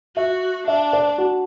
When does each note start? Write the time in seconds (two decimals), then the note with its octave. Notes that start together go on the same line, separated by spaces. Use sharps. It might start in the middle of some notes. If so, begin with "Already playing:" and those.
0.16 F#4 E5
0.67 D4 E5
0.93 D5
1.18 F#4